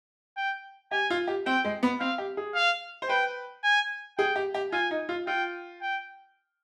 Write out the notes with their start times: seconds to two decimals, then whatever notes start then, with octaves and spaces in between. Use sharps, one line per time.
0.37 G5
0.91 G4 G#5
1.10 F4
1.28 G4
1.46 C4 G5
1.65 G#3
1.83 B3
2.00 C4 F5
2.18 G4
2.37 G#4
2.55 F5
3.02 C5
3.09 B4 G5
3.64 G#5
4.18 G#4 G5
4.36 G4
4.54 G4
4.72 F4 G#5
4.91 D#4
5.09 F4
5.27 F4 G5
5.81 G5